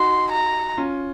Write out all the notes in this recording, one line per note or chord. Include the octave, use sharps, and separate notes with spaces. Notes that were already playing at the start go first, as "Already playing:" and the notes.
Already playing: D#4 F#4 C6
A#5
C#4 F4